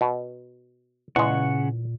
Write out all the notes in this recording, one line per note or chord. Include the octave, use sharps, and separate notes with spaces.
B2
E2 A#2 C#3 G#3 F#5 C#6